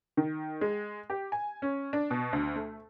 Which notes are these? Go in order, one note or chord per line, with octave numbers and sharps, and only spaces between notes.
D#3
G#3
G4
G#5
C#4
D4
B2
D2
A3